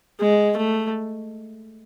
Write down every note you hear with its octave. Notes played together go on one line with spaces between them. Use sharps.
G#3
A3